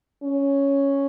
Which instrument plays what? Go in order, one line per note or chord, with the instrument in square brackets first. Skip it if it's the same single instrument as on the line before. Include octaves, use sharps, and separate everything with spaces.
[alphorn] C#4